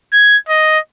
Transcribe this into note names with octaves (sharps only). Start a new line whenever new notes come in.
G#6
D#5